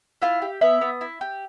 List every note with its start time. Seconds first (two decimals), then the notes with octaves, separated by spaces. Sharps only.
0.22 E4 F4 F5
0.42 G4
0.61 B3 E4 E5
0.81 B3
1.01 E4
1.21 G4